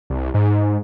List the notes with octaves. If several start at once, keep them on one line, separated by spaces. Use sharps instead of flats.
C2
G#2